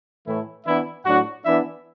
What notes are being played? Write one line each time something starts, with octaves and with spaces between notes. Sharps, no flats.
A2 E3 A3 E4
E3 B3 D4 E4 E5
A2 F#3 D4 F#4 F#5
E3 B3 D4 E4 E5